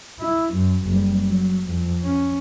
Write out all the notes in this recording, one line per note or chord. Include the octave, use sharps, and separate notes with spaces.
E4
F#2
F#1 G3
F#3
F2
C#4